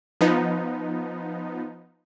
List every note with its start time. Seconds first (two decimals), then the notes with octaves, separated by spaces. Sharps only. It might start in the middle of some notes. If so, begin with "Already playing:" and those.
0.21 F3 B3 D#4